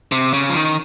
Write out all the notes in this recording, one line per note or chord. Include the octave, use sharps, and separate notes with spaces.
C3
C#3
F3
D#3